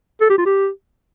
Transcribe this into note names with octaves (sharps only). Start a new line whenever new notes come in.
A4
G4
F4
G4